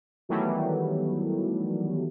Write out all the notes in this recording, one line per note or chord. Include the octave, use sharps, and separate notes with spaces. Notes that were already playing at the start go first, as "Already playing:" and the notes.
D#3 E3 F#3 G3 A3 B3